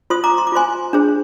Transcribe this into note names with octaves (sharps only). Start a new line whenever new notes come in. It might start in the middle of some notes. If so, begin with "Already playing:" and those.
F4 C5 C6 D#6
A#5 D6
C6
D6
F4 C5 G#5 C6
D4 G#4 C5